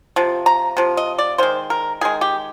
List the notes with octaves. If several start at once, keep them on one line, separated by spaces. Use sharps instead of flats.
C3 F3
A#5
C3 F3
D#5
D5
D#3 G#3 C5
A#4
D#3 G#3 G#4
G4